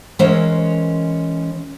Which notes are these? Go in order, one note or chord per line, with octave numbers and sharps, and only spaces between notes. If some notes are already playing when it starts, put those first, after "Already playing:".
E3 G#3 C#4 A#4 C5